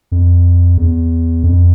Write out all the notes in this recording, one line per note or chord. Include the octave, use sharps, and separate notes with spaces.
F2
E2
F2